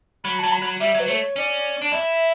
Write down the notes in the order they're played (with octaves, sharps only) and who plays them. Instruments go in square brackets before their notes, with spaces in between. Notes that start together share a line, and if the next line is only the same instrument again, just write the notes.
[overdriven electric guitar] F#3 [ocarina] B5
[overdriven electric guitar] F#3 [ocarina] A5
[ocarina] B5
[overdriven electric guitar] F#3
[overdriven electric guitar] G3 [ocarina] E5
[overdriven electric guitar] F#3 [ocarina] B4
[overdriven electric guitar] A3 [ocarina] C#5
[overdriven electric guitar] C#4 [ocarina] D5
[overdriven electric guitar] D4
[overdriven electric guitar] E4 [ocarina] E5